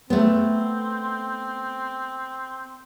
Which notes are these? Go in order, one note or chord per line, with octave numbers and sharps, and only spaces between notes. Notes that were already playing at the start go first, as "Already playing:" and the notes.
A3 B3 C4